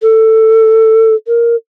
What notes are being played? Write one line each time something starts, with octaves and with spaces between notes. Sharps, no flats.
A4
A#4